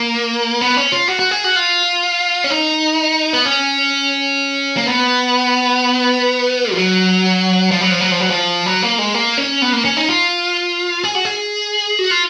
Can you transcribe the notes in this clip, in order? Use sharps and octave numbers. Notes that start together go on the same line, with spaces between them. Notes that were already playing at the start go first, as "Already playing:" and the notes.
Already playing: A#3
B3
C#4
F4
F#4
F#4
G#4
F#4
F4
C#4
D#4
B3
C#4
A#3
B3
F3
F#3
F3
F#3
F3
F#3
F3
F#3
F3
F#3
A#3
G#3
A#3
C#4
B3
A#3
C#4
D#4
F4
G#4
F#4
G#4
F#4
F4